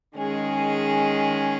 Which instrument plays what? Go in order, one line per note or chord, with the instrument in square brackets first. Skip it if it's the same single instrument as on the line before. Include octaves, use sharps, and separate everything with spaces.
[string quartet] D#3 G#3 C#4 G#4